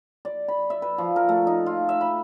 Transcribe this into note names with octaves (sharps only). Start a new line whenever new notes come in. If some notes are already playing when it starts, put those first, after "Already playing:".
D5
B5
E5
B4
F3
A#4
A3
D#4
F4
E5
B5